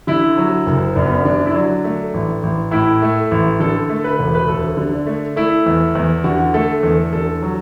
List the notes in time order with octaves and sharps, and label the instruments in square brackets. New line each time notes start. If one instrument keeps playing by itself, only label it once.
[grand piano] D3 E4
F#3
F#1
F#2 D4
B3
D4
D3 D4
E4
F#3 D4
A3
A1
A1
A2 E4
A3
A1
D3 A4
A3
B4
E1
B4
D2 A4
D3
D4
A3
A3 E4
E2
E2
D3 F#4
A3 A4
E2 A4
D3 A4
F#3